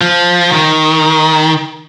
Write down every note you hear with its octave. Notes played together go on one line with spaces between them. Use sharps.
F3
D#3